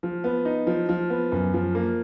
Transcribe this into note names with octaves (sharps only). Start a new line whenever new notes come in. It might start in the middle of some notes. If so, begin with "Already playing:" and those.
F3
B3
D#4
F3
F3
B3
F#2
F3
A#3